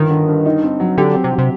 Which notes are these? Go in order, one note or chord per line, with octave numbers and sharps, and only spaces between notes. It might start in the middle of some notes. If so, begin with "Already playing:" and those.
Already playing: G1 D#3
D3
G2
D#4
C4
F#3
D3 G4
C4
C3
F#3
C3